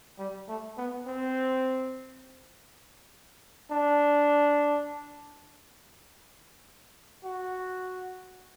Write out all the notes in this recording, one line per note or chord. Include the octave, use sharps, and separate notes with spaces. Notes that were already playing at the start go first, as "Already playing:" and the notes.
G3
A3
B3
C4
D4
F#4